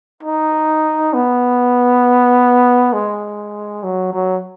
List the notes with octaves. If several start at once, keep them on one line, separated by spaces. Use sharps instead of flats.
D#4
B3
G#3
F#3
F#3